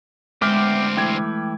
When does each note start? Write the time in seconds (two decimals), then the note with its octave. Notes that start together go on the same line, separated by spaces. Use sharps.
0.42 D2 G#3 B3 C4 E5 G5 D6 F6
0.97 E3 A3 E4 G5 G#6